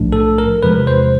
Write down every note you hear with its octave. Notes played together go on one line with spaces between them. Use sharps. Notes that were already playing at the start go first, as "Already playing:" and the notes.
Already playing: B1 A2 F3 A3 D4
A4
A#4
E2 C3 F3 G#3 B4
C5